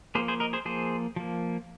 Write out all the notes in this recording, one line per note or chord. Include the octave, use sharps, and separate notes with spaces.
F3 A#3 G#4 C5
G#4 C5
A#4 D#5
G#4 C5
F3 A#3 G#4 C5
F3 A#3